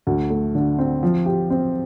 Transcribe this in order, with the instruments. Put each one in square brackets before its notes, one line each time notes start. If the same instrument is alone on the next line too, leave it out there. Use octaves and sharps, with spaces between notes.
[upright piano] D2
A3
D3
C4
F3
G4
C4